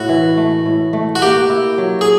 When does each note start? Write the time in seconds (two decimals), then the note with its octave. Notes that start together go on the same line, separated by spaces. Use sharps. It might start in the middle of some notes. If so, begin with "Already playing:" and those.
Already playing: A2 F#4
0.09 E3
0.37 A3
0.66 A2
0.93 A3
1.16 F#4
1.22 A#3 G4
1.49 E4
1.78 F#3
2.01 G#4